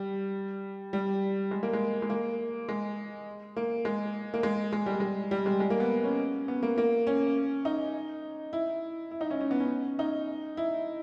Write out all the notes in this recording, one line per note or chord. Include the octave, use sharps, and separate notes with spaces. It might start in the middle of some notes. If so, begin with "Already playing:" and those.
Already playing: G3
G3
G#3
A#3
G#3
G#3
A#3
G#3
A#3
G#3
A#3
G#3
G#3
G3
G#3
G3
G#3
G#3
A#3
B3
C#4
B3
A#3
A#3
C#4
D#4
E4
E4
D#4
C#4
C#4
B3
C#4
D#4
E4